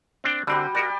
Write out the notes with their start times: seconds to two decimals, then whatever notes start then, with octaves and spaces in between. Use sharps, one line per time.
0.24 C4 D4 G5
0.47 D3 G3 C4 F#4 G4
0.75 F#4 G4 A#4 D5